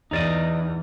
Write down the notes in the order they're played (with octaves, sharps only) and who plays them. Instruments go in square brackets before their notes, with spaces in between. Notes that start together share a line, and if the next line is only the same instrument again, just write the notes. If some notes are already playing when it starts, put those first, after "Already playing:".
[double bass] E2 [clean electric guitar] D#4 D5 D#5